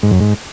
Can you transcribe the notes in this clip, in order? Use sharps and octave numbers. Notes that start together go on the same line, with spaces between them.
G#2
F#2
G#2